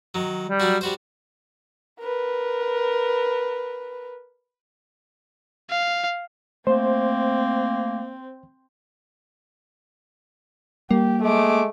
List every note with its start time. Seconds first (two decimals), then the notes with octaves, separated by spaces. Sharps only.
0.15 D#3 F#3
0.47 G3
0.60 F#3 D4 F#4
0.81 G3 F#4 C5
2.00 A#4 B4
5.70 F5
6.67 A3 A#3 C4 C5
10.91 G3 A#3 G4
11.23 G#3 A3 D6